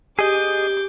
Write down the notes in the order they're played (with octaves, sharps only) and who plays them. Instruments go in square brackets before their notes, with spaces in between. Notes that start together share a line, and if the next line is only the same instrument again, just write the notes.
[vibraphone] G4 [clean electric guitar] G#4 D#5 [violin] D6 G6